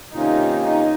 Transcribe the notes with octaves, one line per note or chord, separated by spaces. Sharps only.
C3 D#3 A#3 C#4 D#4 F4
D#4